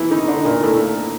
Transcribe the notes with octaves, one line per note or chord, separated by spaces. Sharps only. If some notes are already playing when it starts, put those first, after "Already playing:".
Already playing: E3 A#3 B3 E4 B4
D#3 D#4
D3 D4
A#2 A#3
A2 A3